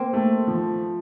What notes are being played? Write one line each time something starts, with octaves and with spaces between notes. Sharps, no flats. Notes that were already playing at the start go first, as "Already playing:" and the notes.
Already playing: A#3 C4
A3
F3